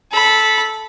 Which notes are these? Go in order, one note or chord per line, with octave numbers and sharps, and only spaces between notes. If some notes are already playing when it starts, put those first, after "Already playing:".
A4 B5